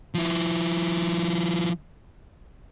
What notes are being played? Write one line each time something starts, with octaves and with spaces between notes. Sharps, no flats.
F3 E4